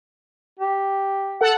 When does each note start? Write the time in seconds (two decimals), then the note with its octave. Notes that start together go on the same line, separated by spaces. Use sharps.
0.59 G4
1.41 A4 F#5